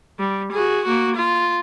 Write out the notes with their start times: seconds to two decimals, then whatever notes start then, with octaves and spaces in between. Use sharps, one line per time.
0.19 G3
0.52 F#4 G#4
0.85 A#3 F#4
1.16 F4